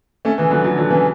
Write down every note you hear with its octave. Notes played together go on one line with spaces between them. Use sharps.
A3 C#4
C#3 E3
D3 F#3
D3 F#3
D3 F#3
C#3 E3